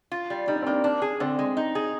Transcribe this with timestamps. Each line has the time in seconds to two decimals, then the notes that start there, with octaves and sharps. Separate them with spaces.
0.12 F4
0.30 G3
0.47 G3 D#4
0.55 D4
0.62 C4
0.67 A#3 D4
0.84 D4
1.02 G#4
1.20 D3 C4
1.39 G#3
1.57 D#4
1.75 G#4